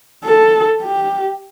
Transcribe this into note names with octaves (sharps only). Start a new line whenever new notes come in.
A4
G4